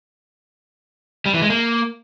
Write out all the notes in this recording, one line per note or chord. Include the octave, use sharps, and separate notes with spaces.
G3
E3
G#3
A#3